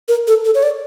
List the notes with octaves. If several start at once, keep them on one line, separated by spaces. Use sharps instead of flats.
A#4
A4
A4
C#5
D5